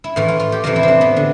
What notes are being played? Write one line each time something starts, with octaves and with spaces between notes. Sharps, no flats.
E4
A2 E3 F4
F4
F4
G4
F2 C3 E3 F4
E4
C4 D4
B3
D3